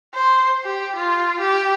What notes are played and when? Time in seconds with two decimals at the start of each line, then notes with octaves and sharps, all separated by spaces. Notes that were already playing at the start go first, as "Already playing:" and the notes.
0.15 C5
0.64 G4
0.96 F4
1.40 G4